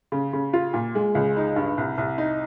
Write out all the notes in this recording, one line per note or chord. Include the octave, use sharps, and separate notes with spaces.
C#3
C#3
F4
A#2
G#3
C#2
D#4
G2
C2
C2
D#4